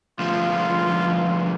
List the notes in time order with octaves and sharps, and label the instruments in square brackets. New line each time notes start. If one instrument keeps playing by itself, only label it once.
[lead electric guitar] D2 F3 [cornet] F4